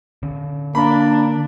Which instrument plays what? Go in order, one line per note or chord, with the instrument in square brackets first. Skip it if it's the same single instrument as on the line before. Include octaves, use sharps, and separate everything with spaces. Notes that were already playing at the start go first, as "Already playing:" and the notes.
[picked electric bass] D3 C#4
[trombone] A#3 [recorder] D4 [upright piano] A#5 B5